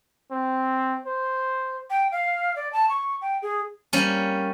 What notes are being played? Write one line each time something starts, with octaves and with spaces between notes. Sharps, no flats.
C4
C5
G5
F5
D5
A5
C#6
G5
G#4
G3 A#3 C#4